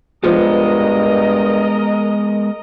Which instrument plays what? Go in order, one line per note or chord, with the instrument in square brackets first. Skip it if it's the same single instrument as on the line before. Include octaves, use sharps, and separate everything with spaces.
[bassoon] G2 [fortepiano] F3 [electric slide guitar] G#3 B3 [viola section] A#4 D#5